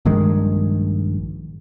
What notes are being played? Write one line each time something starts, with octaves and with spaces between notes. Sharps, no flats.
A#1 G2 D#3 G#3